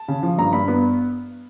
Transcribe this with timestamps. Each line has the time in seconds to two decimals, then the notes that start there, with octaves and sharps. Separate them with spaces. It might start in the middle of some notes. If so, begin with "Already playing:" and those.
Already playing: A5
0.08 C#3
0.23 F3
0.38 G2 A#5
0.53 G2 B5
0.68 B3